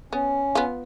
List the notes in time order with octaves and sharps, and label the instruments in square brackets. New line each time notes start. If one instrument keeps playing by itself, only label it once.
[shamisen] B3 [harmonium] C#4
[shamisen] B3 F4